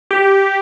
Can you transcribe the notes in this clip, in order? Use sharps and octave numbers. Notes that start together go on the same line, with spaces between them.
G4